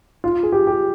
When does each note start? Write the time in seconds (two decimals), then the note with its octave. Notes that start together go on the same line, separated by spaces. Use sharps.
0.24 F4
0.43 G#4
0.52 G4
0.67 G4